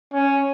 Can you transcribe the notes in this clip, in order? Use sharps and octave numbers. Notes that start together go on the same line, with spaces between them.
C#4